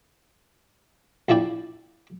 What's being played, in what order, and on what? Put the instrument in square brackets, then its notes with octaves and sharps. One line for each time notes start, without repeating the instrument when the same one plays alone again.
[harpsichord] A#1 F3 E4 D5 G5